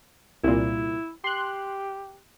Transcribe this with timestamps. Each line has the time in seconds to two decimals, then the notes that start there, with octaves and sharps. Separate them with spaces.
0.44 C2 A#2 E4
1.24 G4 C6 F#6